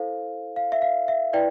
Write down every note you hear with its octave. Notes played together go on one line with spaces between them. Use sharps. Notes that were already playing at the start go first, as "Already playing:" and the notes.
Already playing: E4 A4 C5 F5
F5
E5
F5
E5
E4 B4 D5 G5